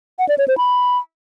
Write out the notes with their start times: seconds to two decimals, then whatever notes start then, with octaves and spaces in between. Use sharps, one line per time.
0.19 F#5
0.29 D5
0.38 C#5
0.48 C5
0.58 B5